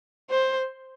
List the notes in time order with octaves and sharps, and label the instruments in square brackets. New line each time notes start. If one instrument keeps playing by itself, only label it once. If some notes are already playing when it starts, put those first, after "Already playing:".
[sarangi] C5